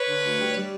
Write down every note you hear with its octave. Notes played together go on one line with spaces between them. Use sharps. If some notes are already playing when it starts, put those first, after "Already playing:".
Already playing: B4 C#5
D3
D2
G3
G3